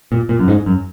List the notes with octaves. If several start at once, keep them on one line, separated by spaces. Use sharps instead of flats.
A#2
A#2
F#2
G#2
F#2